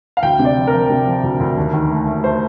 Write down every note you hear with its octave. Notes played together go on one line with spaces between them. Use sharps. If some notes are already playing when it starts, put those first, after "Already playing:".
F5
D2 G5
C3
D5
F3
A#4
F3
C3
F3
D2
D2
D#2
D#3
A3
A3
A3 C5